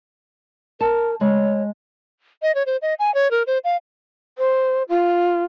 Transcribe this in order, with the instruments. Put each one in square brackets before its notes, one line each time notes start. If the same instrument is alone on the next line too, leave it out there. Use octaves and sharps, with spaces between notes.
[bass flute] A#4 [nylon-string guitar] A5
[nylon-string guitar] G#3 [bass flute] C#5
[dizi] D#5
C#5
C5
D#5
G#5
C#5
A#4
C5
F5
[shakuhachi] C5
F4